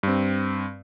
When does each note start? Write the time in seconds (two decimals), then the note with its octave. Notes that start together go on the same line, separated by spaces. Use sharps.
0.03 G2 C4